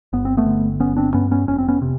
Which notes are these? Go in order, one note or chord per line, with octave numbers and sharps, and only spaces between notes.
G1 B3
C4
A3 B3
D3
G1 B3 C#4
C4 D4
G2 B3 C#4
B3 C#4
F1 C#4
C4
B3 C#4
C3